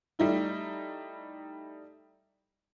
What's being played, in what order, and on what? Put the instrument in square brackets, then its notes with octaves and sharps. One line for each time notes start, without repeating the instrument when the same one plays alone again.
[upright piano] G3 A3 D#4 E4